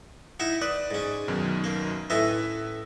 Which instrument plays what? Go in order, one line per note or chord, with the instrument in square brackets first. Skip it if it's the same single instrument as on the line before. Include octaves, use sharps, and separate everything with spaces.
[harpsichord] D#4 E4 E5 [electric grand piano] F#5
[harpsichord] B4 [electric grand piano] D5 D#6 F#6
[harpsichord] G#2 C#4
[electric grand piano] F#2 B2 D#3
[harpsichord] A#3
[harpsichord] A2 C#4 D#5 [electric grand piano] B4 E5 E6